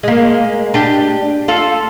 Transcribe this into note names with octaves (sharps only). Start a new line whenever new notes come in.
G#3 A#3
D4 G4
F4 A4